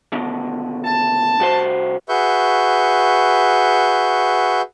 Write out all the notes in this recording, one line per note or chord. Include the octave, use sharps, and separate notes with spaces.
D#2 B2 D3
A5
C2 F#4 C5
F#4 G#4 B4 E5 C#6 G6